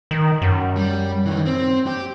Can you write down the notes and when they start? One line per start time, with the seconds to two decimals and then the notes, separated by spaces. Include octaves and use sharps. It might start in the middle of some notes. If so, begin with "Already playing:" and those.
0.11 D#3
0.42 F#2
0.76 G3
1.26 D#3 E3
1.46 C4
1.86 G4